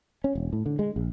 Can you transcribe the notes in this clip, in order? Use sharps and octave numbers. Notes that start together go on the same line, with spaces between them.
C#4
E1
A2
D3
G#3
A#1